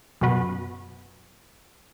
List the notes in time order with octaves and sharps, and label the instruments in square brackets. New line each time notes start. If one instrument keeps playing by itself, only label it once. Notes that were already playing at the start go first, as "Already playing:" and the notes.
[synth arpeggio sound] F#2 B2 F#4 B4